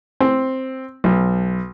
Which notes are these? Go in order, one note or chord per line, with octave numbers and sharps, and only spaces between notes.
C4
B1